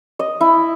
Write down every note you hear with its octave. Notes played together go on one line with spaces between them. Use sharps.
D#5
E4